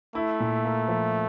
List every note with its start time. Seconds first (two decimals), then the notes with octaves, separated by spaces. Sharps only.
0.15 A3 E4
0.40 A#2
0.65 A#3
0.88 F3